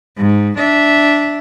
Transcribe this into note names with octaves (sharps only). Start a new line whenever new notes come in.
G#2
D4 E5